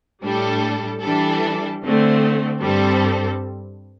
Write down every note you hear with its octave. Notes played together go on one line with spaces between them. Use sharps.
A2 G3 D4 A4
E3 G3 D4 A4
D3 A3 C4
G2 G3 C4 A4